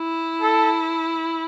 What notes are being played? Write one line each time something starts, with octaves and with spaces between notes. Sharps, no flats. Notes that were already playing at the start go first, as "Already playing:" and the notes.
Already playing: E4
A4